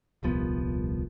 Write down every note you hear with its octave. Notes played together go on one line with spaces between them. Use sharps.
D#1 C2 F3 B3